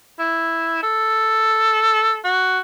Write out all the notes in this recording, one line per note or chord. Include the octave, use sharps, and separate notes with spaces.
E4
A4
F#4